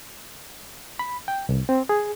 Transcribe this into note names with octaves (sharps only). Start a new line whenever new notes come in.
B5
G5
C2
C4
G#4